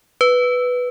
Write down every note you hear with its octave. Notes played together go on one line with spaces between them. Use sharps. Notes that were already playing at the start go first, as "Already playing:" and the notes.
B4